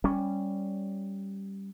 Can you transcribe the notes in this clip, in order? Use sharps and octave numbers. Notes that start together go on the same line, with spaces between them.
G3 C#4